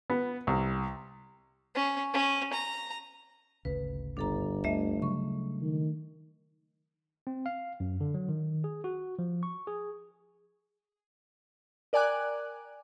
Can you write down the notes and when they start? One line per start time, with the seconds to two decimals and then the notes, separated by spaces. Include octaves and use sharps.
0.10 B3
0.47 C2
1.75 C#4
2.14 C#4
2.53 A#5
3.65 G#1 D2 C#3 B4
4.17 G1 D4 A4 A#5
4.64 D2 A3 D#5 E5
5.02 C#3 F#3 G3 C#6
5.61 D#3
7.27 C4
7.46 F5
7.80 F#2
8.01 D3
8.14 F#3
8.29 D#3
8.64 G#4
8.84 F#4
9.19 F3
9.43 C#6
9.67 G#4
11.93 A#4 D5 G5 G#5 D6 F#6